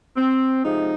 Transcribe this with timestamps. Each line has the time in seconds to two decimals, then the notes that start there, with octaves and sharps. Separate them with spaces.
0.17 C4
0.63 C3 F3 G#3 D#4